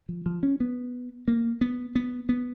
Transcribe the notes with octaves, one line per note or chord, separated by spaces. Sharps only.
F3
F3
C#4
B3
A#3
B3
B3
B3